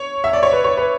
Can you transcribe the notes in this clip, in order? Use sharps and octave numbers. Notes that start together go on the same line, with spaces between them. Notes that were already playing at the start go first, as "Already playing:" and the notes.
Already playing: C#5
E5
D5
C#5
B4
C#5
B4